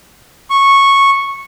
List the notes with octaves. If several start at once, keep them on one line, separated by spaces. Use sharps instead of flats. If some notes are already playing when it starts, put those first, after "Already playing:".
C#6